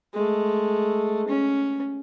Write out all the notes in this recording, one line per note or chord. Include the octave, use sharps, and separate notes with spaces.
G#3 A3
C#4